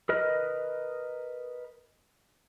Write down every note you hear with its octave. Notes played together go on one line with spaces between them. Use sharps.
A#4 B4 D#5 F6